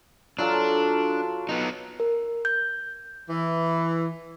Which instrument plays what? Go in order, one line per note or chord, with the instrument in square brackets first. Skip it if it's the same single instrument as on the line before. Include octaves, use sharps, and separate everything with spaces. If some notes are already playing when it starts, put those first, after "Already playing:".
[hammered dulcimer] F#3 F4 A4 [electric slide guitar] D4
[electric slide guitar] B3 D#4
[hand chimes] A#4
G6
[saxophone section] E3